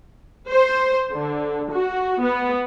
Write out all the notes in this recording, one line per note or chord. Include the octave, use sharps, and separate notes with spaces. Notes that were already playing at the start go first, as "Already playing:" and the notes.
C5
D3
F#4
B3